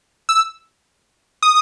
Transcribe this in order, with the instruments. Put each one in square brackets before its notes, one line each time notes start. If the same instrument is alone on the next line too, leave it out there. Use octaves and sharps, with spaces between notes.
[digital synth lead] E6
D#6